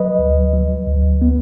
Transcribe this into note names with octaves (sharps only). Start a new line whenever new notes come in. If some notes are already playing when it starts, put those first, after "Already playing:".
Already playing: F#3 B4 D#5
D2
F#3
D2
B3